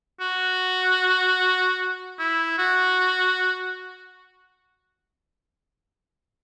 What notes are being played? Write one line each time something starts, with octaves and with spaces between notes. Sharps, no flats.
F#4
E4
F#4